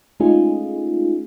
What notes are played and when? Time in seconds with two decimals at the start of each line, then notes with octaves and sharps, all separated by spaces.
0.20 G#3 A3 C#4 D#4 F4 G#4